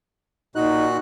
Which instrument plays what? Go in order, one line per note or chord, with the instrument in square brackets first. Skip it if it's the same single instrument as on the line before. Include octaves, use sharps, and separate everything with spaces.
[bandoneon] A#2 F#4 F#6 [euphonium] D#4